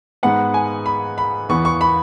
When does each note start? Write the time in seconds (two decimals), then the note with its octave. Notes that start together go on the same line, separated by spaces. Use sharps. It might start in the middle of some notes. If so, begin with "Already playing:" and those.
0.23 G#2 G#3 B3 F#5
0.54 G#5
0.86 B5
1.18 B5
1.49 E2 E3 B3 C#6
1.65 C#6
1.81 B5